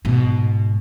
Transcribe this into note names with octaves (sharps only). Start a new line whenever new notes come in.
G#2 B2